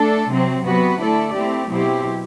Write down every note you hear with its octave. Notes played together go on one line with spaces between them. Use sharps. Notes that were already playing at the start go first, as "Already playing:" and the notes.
Already playing: A3 D4 A4
C3 F#3 C4
C3 F#3 B3 F#4 B4
D3 A3 E4 A4 D5
A3 C4 E4 G4
B2 F#3 C4 E4 G4